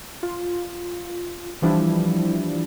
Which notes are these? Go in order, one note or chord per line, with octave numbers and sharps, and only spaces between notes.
F4
E3 F3 G3 D4 E4